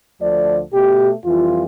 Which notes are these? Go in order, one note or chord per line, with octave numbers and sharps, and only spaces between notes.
D2 D3 F3 A3 D5
B2 A3 G4
F2 E3 G3 F4